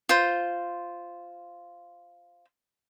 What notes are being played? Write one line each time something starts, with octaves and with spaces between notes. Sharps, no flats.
F4 C5